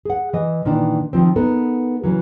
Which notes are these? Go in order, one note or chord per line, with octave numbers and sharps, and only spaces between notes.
G#4 F#5
E3 D#5
A#2 D#3 E3 D4
D#3 F3 C4
B3 D#4 A4 A#4
C#3 E3 F#3